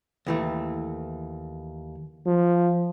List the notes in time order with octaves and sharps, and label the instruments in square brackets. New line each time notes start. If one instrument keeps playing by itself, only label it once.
[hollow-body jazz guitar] D#2 E3 A3
[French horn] F3